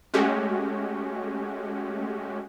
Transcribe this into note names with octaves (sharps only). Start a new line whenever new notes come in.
G#3 A3 C#4 F#4 G4